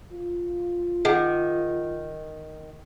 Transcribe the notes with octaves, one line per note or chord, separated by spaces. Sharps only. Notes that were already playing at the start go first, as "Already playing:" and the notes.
F4
D#3 G#4 F#5